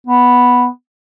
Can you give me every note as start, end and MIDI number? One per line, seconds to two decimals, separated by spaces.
0.07 0.67 59